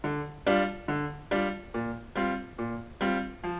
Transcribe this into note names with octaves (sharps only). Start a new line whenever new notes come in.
D3
G3 D4 F4
D3
G3 D4 F4
A#2
G3 C4 F4
A#2
G3 C4 F4
F3